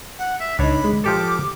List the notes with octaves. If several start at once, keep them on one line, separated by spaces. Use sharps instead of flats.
F#5
E5
C#2 D4 D#4 C#5 A5 B5
G#3
F3 G4 A4 D6